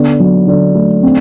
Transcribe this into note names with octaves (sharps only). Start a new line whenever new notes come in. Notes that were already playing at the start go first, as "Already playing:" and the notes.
Already playing: D3 B3
F#3
D3
A3
C4